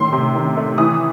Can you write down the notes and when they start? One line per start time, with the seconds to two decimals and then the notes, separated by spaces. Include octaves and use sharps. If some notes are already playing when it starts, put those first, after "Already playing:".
Already playing: A2 D#3 C6
0.13 C3
0.35 D#3
0.57 A3
0.78 E3 D#6